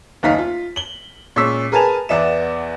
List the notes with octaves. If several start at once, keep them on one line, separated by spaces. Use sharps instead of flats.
F#1 D#2 D#4 F5 B6
F4
F#7 G7
A#2 G#3 C#4 C#6 E6 B6
G#4 A#4 B4 G#5 A5 F7
E2 B3 D5 E5 E7